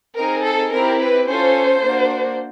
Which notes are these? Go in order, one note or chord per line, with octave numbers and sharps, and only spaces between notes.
C4 D#4 G#4 A#4
A4
C4 E4 G4 A#4
B4
C#4 F4 A4 C5
A#3 D4 F#4